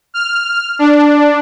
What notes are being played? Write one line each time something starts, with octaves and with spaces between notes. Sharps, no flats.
F6
D4